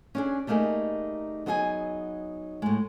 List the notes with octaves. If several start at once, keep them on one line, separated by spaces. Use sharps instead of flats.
C#4 D4 G#4
G3 A3 A#3 D#4 G#4
F#3 B3 D#4 G#4 D#5 G#5
A2 G#3